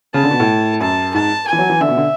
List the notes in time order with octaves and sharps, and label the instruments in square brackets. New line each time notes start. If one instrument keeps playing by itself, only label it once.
[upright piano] C#3 [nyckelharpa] A5
[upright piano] D3
B2
A2
[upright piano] F#2 [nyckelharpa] A5
[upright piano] G#2 [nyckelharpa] A5
[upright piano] E3 [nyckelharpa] G#5
[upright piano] F#3
E3
[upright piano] D3 [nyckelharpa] E5
[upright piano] B2
D3